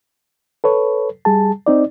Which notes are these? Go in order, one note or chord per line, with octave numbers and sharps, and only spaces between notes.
A4 B4 C#5
G3 G#4 A5
C4 D#4 D5